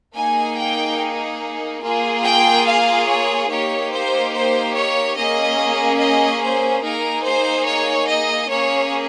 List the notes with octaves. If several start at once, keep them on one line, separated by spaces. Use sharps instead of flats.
A#3 D#4 G#4 G#5
G5
A#3 F4 G#4
G5
F5
C#5
A#3 D#4 G4 C#5
C5
C5
C#5
A#3 C#4 G#4 D#5
D#5
C5
A#3 D#4 G#4 A#4
C5
C#5
D#5
A#3 C#4 G#4 C#5